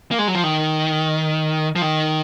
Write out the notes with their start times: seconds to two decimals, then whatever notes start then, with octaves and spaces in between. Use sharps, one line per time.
0.11 A#3
0.19 G#3
0.28 F#3
0.35 F3
0.44 D#3
1.76 F3
1.82 D#3